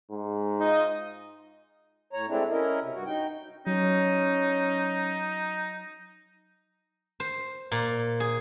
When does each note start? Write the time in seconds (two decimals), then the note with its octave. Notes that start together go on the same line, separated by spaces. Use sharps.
0.11 G#2
0.61 D#4 F4 D#5
2.13 A2 C#5 A#5
2.28 G#3 A3 C4 D4 E4
2.51 C#4 E4 A#4 D#5
2.82 C3
2.94 G2 F#4
3.06 D#4 G5
3.67 F#3 C#4 D#4
7.20 C5
7.72 A#2
8.20 G#4